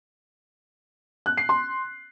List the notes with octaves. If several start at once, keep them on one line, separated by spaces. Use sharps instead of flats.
F#6
C7
C6